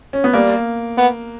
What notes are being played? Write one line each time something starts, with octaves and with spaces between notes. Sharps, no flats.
C#4
B3
G3 A#3
B3